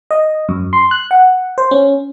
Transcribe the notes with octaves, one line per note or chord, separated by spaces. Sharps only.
D#5
F#2
C6
F#6
F#5
C5
C#4